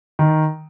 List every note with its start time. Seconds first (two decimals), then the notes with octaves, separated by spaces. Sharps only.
0.19 D#3